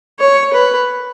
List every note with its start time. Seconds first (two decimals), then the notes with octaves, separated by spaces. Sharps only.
0.20 C#5
0.54 B4